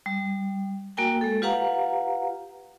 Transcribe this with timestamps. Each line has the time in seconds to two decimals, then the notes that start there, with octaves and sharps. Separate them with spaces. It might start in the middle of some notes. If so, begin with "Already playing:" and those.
0.06 G3
0.97 A#3 F#4 A#4 G5 G#5
1.21 G#3 A4
1.42 F4 G4 B4 F5 F#5 A#5